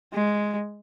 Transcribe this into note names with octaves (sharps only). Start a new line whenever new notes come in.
G#3